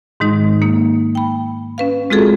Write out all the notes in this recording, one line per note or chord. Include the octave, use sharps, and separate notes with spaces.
G#2 D#3 G#3 D#4
A#3 D#4
G5 B5
C#4 B4 F5
G#3 C4 F4 F#4 G#4 A4